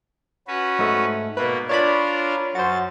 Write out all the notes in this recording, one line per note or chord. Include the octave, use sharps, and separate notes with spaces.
C#4 F#4 B4
G#2 A3
B2 A#3 B4
D4 F4 A#4 C#5 D5 B5
F#2 F#4 C5 A6